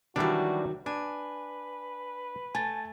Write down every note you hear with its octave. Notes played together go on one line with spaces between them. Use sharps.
D#3 E3 F#3 G3 D4 F#4
D4 B4 G#5
A3 G#5 A5 A6